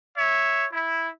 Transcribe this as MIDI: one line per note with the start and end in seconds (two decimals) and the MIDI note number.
0.17 0.66 73
0.17 0.66 76
0.71 1.09 64